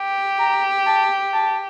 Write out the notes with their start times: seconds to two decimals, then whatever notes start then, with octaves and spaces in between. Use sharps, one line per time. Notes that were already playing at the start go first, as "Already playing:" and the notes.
Already playing: G4
0.39 A#5
0.87 A5
1.33 A5